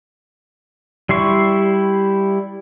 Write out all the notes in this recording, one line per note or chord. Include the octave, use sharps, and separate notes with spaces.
G3 E4 C6 C#6